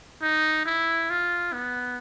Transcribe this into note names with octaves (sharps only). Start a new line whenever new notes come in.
D#4
E4
F4
B3